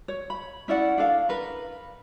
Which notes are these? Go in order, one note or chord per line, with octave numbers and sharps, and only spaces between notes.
C#5
B5
C#4 E4 D5 F#5
D4 A4 F5
A#4 B4